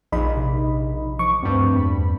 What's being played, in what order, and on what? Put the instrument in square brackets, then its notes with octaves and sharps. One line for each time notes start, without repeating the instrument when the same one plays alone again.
[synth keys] A#1 [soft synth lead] D#4 [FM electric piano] D#5 B5
[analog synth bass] C3
[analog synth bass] F3 [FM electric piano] C#6 [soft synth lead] D6
[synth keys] D2 G2 [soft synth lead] C4
[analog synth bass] E2 [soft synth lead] B5